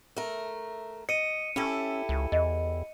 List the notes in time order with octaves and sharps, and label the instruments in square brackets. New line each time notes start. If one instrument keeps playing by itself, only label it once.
[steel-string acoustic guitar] A3 A#4
[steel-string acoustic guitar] D#5 [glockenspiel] C#7 D#7
[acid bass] C#4 [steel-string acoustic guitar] E4 G4 A4
[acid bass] C#2
[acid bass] E2 [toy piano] D#5